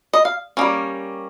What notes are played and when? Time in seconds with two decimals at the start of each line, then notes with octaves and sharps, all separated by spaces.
0.13 D#5
0.25 F5
0.57 G3 A#3 C#4